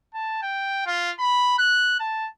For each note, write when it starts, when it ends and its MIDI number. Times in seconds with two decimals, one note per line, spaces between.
0.14 0.42 81
0.42 0.86 79
0.86 1.12 65
1.19 1.54 83
1.59 1.99 90
2.00 2.28 81